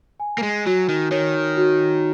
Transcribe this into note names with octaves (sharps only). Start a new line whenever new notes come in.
G#5
A#3
G#3
F#3 F#4
D#3
D#3 C#5
F#4